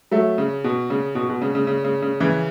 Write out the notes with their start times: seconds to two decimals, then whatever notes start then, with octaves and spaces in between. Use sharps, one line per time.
0.11 F#3 A3
0.38 C#3
0.64 B2
0.90 C#3
1.15 B2
1.29 B2
1.42 C#3
1.55 C#3
1.67 C#3
1.85 C#3
2.02 C#3
2.20 C#3 E3